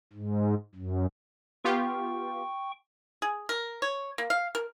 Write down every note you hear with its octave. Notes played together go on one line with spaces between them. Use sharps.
G#2
F#2
B3 F4 G4 G5 C#6
G#4
A#4
C#5
A#3
F5
A#4